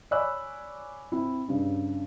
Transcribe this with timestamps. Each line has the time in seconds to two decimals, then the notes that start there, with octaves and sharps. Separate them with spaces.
0.11 C#5 D5 G#5 B5 E6 F#6
1.12 C4 E4
1.48 G2 C#3